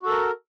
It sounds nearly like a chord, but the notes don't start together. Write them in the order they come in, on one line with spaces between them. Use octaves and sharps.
F#4 A4 A#4